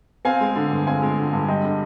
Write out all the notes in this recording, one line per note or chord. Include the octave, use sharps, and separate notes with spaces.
C4 F5 G#5
G#3
D3
G2
C4 F5 G#5
G#3
D3
G2
G3 D#5 G5
D3